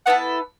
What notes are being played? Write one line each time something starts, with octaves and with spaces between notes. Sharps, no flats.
B3 E4 A4 F#5